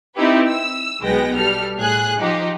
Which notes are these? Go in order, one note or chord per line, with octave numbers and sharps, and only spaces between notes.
C4 D#4 E4 G4 B4
E6
B1 G#3 B3 G5 A#6
G3 A4 F6
A2 G#4 F#6
F3 D#4 G4